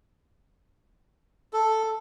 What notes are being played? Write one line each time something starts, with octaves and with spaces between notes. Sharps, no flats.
A4